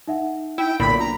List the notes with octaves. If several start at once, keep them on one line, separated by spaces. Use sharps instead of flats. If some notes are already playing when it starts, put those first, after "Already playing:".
D#4 E5 F#5
E4 G5
B1 A#2 D3 B5
A#5